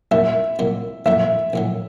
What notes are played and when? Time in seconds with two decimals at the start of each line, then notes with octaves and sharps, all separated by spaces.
0.11 C2 A#2 F#3 E5
0.59 C2 A#2 F#3
1.06 A#1 A2 F#3 E5
1.53 A#1 A2 F#3